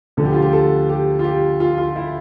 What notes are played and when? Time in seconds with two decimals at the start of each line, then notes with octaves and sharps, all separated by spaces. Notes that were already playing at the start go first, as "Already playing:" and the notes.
0.17 D2 D3 F3 A4
0.25 G4
0.33 F4
0.42 G4
0.53 A4
0.89 G4
1.19 F4
1.24 G4
1.60 F4
1.78 F4
1.96 E4